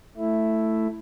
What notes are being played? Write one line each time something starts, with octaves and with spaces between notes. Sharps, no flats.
A3 E4